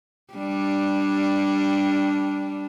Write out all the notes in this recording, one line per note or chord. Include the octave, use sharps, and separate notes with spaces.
G3 D4